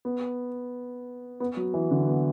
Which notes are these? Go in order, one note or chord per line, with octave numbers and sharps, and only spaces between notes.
B3
B3
F#3
E3
D3
B3